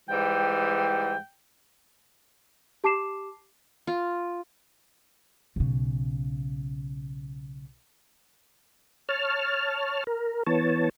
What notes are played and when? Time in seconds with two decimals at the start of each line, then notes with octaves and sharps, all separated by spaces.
0.08 G#2 E3 G3 G5
2.84 G4 A5 D6 C7 E7
3.87 F4
5.56 B1 C#3
9.09 C#5 A5 F6
10.07 A#4
10.47 E3 B3 C#5 A5